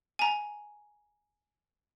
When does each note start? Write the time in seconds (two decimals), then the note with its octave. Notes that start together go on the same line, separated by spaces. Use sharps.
0.19 G#5 A#5